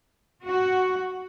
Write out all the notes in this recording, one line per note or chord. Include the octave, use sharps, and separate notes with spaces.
F#4